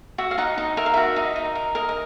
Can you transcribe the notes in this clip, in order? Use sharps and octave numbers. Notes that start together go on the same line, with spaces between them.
F#4 E5
F5
D#4 F#5
D#4 D#5
A#4 E5
F5
F#4 E5
D#4
D#4
A#4
A#4 D#5
D#5